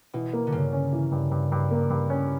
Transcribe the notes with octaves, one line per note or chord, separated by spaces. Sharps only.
B2 E3
A#3
D3
G2 C#3
C#4
E3
G2
G2
G2
A#3
G2
C#4